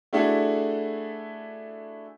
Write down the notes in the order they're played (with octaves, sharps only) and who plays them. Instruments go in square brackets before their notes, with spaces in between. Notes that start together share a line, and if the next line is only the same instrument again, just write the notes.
[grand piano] A3 D4 E4 F#4 G#4 A4